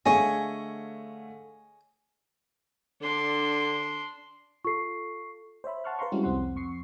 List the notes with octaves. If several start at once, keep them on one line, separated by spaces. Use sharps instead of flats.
D3 A3 G#4 C#5 D#5 F5 G#5
D3 D4 C6
F4 A4 C#6 C7
C5 C#5 E5 B5
F#5 A5 C6 C#6 F6 F#6
B4 C5 F5 A#5 C6 C#6
G3 G#3 C4 C#4 E4 F#4
C2 F2 C4 F#5 C6
F2 C#6 C7